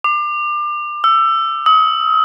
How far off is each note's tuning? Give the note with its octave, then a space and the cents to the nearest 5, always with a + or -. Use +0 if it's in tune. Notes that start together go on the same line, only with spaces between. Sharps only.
D6 +30
E6 +20
D#6 +40